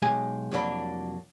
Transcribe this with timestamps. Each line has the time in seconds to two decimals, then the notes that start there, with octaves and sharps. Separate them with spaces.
0.02 B1 G#3 G4 G#5
0.51 C2 F2 F#3 A#3 D4 B5